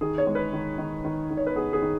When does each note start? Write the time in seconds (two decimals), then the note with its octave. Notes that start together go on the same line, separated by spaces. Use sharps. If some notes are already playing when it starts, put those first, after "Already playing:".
0.01 D#3 G#4
0.18 C#5
0.27 G#3
0.35 B4
0.53 D#3
0.78 D#3
1.05 D#3
1.30 D#3
1.37 C#5
1.47 B4
1.56 B3 G#4
1.73 G#4
1.82 D#3